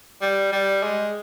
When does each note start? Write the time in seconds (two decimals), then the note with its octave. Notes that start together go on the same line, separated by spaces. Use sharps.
0.22 G3
0.52 G3
0.83 G#3